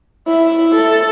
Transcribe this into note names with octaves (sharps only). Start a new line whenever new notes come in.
E4
A4